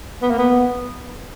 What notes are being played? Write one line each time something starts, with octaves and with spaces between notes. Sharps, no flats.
B3
A#3
B3